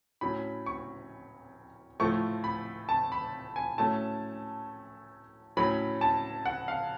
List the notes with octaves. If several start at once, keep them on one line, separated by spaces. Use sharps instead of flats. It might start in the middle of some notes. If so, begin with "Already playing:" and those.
A2 F#3 C#4 B5
C#6
A2 F3 A3 C#6
B5
A5
B5
G#5
A2 F#3 A3 C#4 A5
A2 F#3 C#4 B5
A5
F#5
F5